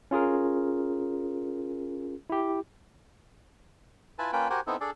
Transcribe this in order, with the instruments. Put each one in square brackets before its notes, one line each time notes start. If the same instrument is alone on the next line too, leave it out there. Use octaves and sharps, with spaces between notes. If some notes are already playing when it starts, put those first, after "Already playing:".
[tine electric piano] C#4 F4 G#4 A#4
E4 G4
[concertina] E4 F4 B4 G#5 A5
A#3 C#4 F4 B4 G5
F#4 G4 A#4 C5 F#5 G#5
B3 C4 D#4 E4 A4
D4 G#4 A4 D5